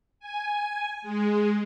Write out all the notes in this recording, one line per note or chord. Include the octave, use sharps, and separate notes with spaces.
G#5
G#3